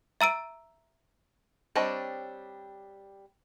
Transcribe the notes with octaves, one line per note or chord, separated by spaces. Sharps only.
E5 A#5 E6 D7
G3 C4 D4 C#5 D#5